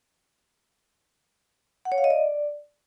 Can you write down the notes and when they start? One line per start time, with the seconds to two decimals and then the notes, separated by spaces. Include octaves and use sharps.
1.85 F#5
1.92 C#5
1.98 F5
2.04 D#5
2.10 D5